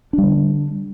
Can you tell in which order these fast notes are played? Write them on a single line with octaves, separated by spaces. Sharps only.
D4 G3 D3